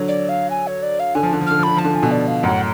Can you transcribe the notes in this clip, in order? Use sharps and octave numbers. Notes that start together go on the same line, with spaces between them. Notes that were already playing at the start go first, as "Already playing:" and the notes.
Already playing: D3 F#3
D5
F5
G#5
C#5
D5
F5
D3 G#5
F3
D3
F3
D3 F6
F3
D3 B5
F3 A5
D3
F3 G#5
B2 D3
D5
F5
F#2 A2 F#5